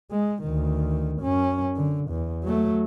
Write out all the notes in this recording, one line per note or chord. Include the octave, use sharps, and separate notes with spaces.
G#3
D2 D#3
F#2 C#4
D3
E2
F#3 A3